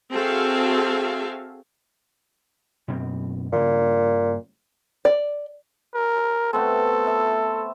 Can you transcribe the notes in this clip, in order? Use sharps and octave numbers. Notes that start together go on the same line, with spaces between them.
C4 F#4 G#4 A4 E5 F5
F#2 B2 C4
G2 A#2 C#3 A#3
D5
A#4
A3 B3 C4 A4
E5